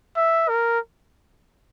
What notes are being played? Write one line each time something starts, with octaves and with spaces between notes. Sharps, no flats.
E5
A#4